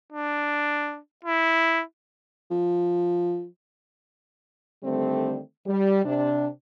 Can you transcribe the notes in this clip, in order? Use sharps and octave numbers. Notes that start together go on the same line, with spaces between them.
D4
E4
F3
D3 D#3 G3 A3 C4
G3
C3 D4